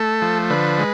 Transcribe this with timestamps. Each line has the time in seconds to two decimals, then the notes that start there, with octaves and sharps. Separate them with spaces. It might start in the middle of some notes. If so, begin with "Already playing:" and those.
Already playing: A3 A4
0.22 F3
0.50 D3 B4
0.78 G#3